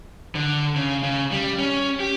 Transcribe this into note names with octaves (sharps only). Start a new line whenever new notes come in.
D3
C#3
C#3
G3
C#4
G4